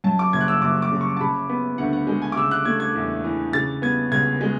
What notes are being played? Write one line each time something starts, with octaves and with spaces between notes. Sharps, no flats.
F#2 A5
D6
F#1 G#6
F#6
E6
F#1 D6
D6
C#3
C#6
A5
C#3 B5
B3 B5
D2 F#5
F#5
G#3
G#5
D6
C#3 E6
F#6
A3 G#6
G#6
E2
E3
C#3 A6
B3 G#6
C#2 G#6
G#3